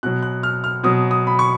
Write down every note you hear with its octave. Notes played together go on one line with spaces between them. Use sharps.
B2 F#3 F#6
F#6
F6
F6
B2 F#3 D#6
D#6
B5
C#6